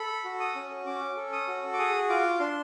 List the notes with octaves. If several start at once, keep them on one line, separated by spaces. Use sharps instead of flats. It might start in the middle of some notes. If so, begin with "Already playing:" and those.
Already playing: A4 B5
F#4
D#6
C#4
C#4 D6
A4
D#6
F#4
D6
G#4 D#6
F4 D6
D4 C6